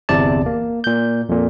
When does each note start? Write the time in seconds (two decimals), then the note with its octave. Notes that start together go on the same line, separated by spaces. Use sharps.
0.09 G1 E2 C3 D5 A5
0.46 A#3
0.84 A#2 G6
1.29 F2 A#2